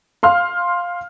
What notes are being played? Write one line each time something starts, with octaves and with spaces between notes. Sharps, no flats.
F5 C6 F6